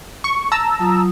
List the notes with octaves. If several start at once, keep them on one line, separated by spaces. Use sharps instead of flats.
C#6
A5 A#5 E6
F#3 F4 D#6